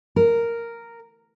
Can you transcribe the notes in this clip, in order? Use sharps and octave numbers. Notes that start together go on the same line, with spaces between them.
A#4